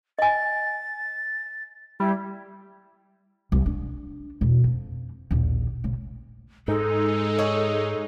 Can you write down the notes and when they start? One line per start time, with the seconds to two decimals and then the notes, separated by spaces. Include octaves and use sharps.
0.19 D#5 G#5 A6
2.00 G3 E4
3.52 C2
3.66 D4
4.41 E2 B2
4.64 F2
5.31 A#1 D#2
5.84 A#1 C#3
6.68 G#2 G#3 D#4 A4
7.39 G#4 C#5 D#5